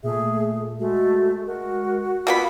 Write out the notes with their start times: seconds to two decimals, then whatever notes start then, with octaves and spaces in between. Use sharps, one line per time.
0.03 A#2 A3 G#4 E5
0.80 G#3 A3 F#4
1.47 F#4 A#4
2.27 A#3 B3 F4 B5